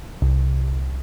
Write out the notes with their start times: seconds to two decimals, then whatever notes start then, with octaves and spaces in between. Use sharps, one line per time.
0.22 C2